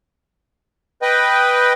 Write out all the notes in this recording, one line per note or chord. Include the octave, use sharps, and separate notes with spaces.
B4 D#5 G5